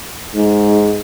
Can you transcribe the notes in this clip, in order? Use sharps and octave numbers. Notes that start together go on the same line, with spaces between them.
G#2